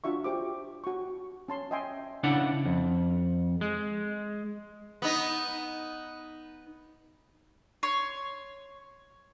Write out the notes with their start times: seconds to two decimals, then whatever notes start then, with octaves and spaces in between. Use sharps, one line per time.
0.04 D4 F4 F#4 E5 C#6
0.24 G4 C5 D6
0.84 F#4 C#6
1.48 C#4 A5 C6
1.71 D#5 E5 G5 G#5 C6
2.23 C#3 D4 E4 F#5
2.66 F2
3.61 G#3
5.02 B3 D#4
7.83 C#5 C6